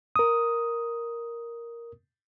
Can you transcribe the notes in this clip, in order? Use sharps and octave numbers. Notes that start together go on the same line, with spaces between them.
A#4 D#6